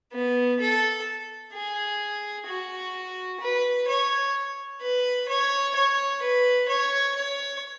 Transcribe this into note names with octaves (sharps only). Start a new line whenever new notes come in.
B3
A4
G#4
F#4
B4
C#5
B4
C#5
C#5
B4
C#5
C#5